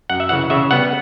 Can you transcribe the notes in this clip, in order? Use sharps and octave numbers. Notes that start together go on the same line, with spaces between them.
F#2 F#5
E5
C#3 E3 F#5
C#3 E5
G3 B3 F#5